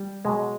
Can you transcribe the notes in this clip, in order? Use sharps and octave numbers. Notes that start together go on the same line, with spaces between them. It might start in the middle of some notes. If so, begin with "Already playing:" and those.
Already playing: G3
B2 F#3 G#3